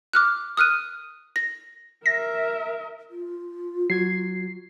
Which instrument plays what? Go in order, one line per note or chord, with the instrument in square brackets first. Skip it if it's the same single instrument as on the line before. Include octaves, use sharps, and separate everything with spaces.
[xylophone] D6 F6 F#6
D#6 F6 F#6 D#7
A#6
[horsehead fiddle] A#4 E5 [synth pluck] A#6
[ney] F4
[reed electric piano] F#3 F#4 G#6 [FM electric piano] C7